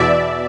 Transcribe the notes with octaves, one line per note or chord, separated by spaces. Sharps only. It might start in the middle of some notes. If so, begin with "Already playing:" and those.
Already playing: E2 B2 D5 E5